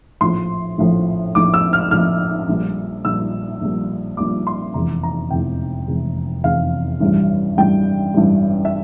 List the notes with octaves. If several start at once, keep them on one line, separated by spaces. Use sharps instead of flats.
A#1 A2 F3 C6
A#1 A2 F3
A#1 A2 F3 D6
E6
F6
A#1 A2 F3 F6
A#1 A#2 G3
A#1 A#2 G3 E6
A#1 A#2 G3
A#1 A#2 G3 D6
C6
F1 E2 E3 A#5
A#5
F1 E2 E3 G5
F1 E2 E3
F1 E2 E3 F5
A1 G2 E3 G3
A1 G2 E3 G3 G5
A1 G2 E3 G3
E5